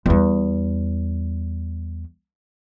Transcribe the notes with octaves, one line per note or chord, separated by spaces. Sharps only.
E2 G3